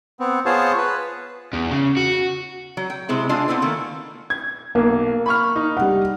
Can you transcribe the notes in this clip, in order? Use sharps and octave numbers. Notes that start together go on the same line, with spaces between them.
B3 C4
B3 F4 G#4 C5 C#5 A5
B4
E2
C#3
F#4
F#3
G5
C3 G#3 C4 E4 G#4
D4 F4 D#5 E5 G#5
B3 C4 D4 E4 B4
D#3 A3 A#3
G#6
B1 A#3
B5 C#6 F6
D#4
G3 F#5